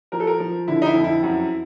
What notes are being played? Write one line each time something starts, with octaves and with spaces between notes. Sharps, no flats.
F3 A#4
A4
A#4
F3
D3 E4
D#4
E4
F2
E4
F#2